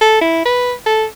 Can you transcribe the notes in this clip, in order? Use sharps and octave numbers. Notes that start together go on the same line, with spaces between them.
A4
E4
B4
A4